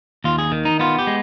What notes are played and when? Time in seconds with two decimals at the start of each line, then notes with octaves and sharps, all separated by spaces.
0.24 D#2 F4
0.38 G#4
0.52 D#3
0.65 D#4
0.80 B3 F4
0.99 G4
1.07 G#3